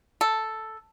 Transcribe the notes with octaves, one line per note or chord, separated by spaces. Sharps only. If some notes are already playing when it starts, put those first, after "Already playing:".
A4